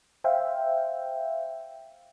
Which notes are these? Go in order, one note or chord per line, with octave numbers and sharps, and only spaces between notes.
C5 E5 F5 G5